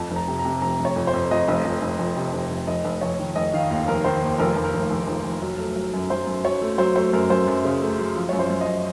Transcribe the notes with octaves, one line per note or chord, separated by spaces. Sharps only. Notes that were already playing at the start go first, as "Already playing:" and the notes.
Already playing: F2 A5
F1
A#5
C3
A#5
C3
F1 A#5
F1
C#5
F2
C5
F2
F2 D#5
F1
F1
F1
F1
C3
F1
F1
F1 D#5
F1
F1 C#5
D#3
F1 D#5
D#3 F5
D#2 F5
F1 A#4
D#3 C5
D#2
F1 A#4
F1
A#4
F1
F1
F1
F1
F#3
A3
F#3
F#2
F#3 C5
F#2
F#3 C#5
A3
F#3 C5
A3 C5
F#2 A#4
F#2 C5
F#2
C#3
A3
F#3
F3
F#2 C#5
C5
F#2
D#5
F#2